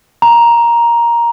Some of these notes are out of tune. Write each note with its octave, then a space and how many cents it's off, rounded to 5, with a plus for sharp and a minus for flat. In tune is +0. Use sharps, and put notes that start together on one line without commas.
A#5 +10